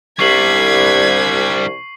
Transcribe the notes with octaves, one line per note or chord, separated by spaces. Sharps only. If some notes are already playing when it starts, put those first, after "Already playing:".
C2 D3 G3 C#6 G#6 B6 C7 F#7